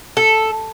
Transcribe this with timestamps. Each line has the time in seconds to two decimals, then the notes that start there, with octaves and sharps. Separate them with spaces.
0.17 A4